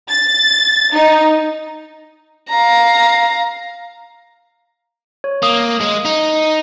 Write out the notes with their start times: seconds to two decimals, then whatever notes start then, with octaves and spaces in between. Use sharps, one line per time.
0.10 A6
0.95 D#4
2.49 F5 A#5
5.24 C#5
5.43 A#3 D#6
5.81 G#3
6.05 D#4